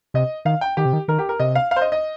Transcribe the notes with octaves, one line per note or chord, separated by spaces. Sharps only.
C3 D#5
D#3 F5
G5
D#3 G4
C3
D#3
D#3 A#4
G4
A#4
C3 D#5
F5
F5
C5
D#5
D#5